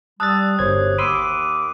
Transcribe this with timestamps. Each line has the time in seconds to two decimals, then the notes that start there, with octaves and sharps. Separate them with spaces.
0.20 G3 A5 D#6 E6 F#6 A6
0.59 G1 F#2 G4 C5 C#5 G#6
0.99 D#2 A#3 B5 C6 D6 E6 D#7